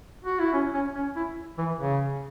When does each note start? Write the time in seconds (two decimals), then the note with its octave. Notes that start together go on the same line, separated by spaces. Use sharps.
0.24 F#4
0.39 E4
0.53 C#4
0.74 C#4
0.95 C#4
1.16 E4
1.58 E3
1.79 C#3